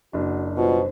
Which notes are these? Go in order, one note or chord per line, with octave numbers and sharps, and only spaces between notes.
F#1 D4 F#4
B2 G3 B3 F4 C5